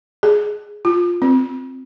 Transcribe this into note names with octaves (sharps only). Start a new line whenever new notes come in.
G#4
F4
C4